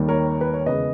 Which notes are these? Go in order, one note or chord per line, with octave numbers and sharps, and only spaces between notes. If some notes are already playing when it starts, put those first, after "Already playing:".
Already playing: D#2 D#3 G3
A#4 C#5
B4
C#5
E2 C#3 G#3 B4 D#5